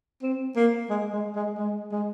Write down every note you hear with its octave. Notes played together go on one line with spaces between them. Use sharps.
C4
A#3
G#3
G#3
G#3
G#3
G#3